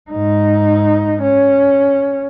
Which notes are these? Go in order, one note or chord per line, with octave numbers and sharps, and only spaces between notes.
G#2 D#4
C#4